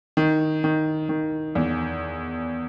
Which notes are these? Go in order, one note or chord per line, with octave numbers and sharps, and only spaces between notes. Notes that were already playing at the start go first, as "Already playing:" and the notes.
D#3
D#3
D#3
E2